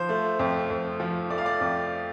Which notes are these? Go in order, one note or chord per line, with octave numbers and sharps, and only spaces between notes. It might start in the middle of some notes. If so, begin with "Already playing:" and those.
Already playing: F3 C5
A3
F2
F2
F3
A3 D5
F5
D5
F2